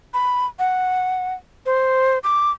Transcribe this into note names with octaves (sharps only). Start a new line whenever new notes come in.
B5
F#5
C5
D6